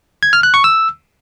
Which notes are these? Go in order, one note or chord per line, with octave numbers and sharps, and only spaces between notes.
G#6
F6
F#6
C#6
E6